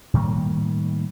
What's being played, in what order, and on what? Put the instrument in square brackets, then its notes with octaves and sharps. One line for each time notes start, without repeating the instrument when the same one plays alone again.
[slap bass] A2 D#3 G3 A#3